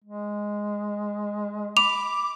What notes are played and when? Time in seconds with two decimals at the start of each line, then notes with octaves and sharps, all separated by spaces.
0.04 G#3
1.77 B5 D6 F7